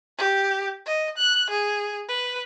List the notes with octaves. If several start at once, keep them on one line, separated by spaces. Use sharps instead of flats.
G4
D#5
F#6
G#4
B4